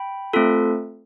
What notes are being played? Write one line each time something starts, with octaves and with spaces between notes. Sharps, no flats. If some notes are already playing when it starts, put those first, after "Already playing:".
Already playing: G5 B5
A3 C4 F4 A4